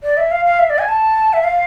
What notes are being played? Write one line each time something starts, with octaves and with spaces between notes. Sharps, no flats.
D5
E5
F5
F5
E5
D5
G#5
A5
E5
F5